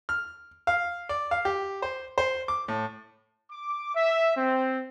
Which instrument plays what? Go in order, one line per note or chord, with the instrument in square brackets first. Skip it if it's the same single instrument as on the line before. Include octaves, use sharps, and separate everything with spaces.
[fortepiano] F6
F5
D5
F5
G4
C5
C5
D6
A2
[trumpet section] D6
E5
C4